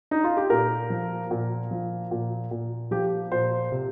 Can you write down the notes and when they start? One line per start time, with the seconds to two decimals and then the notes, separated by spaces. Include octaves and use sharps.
0.11 D#4
0.24 F4
0.37 G4
0.50 A#2 A#4
0.90 F3
1.31 A#2
1.71 F3
2.11 A#2
2.51 A#2
2.91 F3 G4
3.32 A#2 C5
3.72 C3